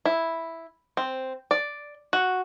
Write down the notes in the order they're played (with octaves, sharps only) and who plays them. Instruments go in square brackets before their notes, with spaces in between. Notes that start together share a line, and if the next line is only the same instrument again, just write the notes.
[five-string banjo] E4
C4
D5
F#4